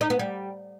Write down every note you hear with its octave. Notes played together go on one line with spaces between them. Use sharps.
D#4
B3
G3